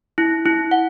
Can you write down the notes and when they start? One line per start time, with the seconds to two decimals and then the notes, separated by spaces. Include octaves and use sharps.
0.18 E4
0.46 E4
0.71 F#5